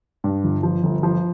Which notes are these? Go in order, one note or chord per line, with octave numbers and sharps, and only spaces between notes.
G2
G1
F3
G1
F3